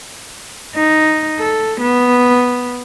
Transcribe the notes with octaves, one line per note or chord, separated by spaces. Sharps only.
D#4
A4
B3